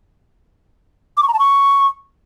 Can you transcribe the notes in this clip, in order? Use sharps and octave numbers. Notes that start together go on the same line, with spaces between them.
D6
C#6
A#5
A5
C#6